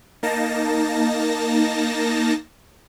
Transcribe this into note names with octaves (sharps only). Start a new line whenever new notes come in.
A#3 D#4 A5 A#6